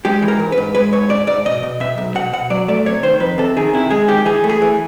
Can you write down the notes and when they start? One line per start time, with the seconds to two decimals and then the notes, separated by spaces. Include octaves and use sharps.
0.05 G#3 G4
0.22 E3
0.28 A#4
0.39 G#2
0.52 B4
0.58 G#2
0.75 G#3 B4
0.93 G#2 C#5
1.10 G#2 D5
1.27 G#2 D5
1.45 B2 D#5
1.63 B2
1.80 B2 E5
1.98 B1
2.15 B2 F#5
2.33 B2 F#5
2.50 F#3 D5
2.68 A3 D5
2.86 C3 C#5
3.03 D#3 C5
3.20 F2 B4
3.38 C3 A4
3.57 D#3 G#4
3.74 C3 E4
3.90 G#3 G#4
4.08 D#3 G4
4.25 E3 G#4
4.44 A3
4.50 G#4
4.62 E3